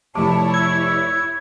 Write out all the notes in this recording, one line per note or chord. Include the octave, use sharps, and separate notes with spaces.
F1 E4 C#5 A5 D6
E6 G#6